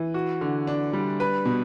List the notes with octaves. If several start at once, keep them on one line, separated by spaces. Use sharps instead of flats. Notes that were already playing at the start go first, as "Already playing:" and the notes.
Already playing: E3
F#4
D3
D4
G3
B4
B2